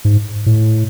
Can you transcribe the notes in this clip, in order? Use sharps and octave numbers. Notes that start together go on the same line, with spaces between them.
G#2
A2